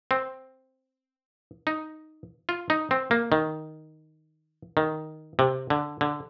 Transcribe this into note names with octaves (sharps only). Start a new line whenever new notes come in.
C4
D#4
F4
D#4
C4
A#3
D#3
D#3
C3
D3
D3